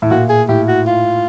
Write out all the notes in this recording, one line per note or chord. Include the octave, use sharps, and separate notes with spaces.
A2
A#2 F#4
G#4
A2 G4
F#4
F4